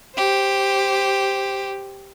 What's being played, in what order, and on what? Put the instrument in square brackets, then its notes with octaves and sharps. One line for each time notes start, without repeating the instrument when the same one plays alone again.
[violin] G4 C5